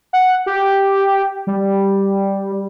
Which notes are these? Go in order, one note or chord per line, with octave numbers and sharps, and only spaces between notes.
F#5
G4
G3